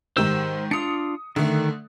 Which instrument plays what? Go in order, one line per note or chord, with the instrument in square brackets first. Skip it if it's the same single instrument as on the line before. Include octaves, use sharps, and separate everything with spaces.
[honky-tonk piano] G#2 D#3 G4 [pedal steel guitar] C5 E6
[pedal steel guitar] D4 F4 [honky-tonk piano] D#6 C#7
[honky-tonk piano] D3 A3 [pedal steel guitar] D#3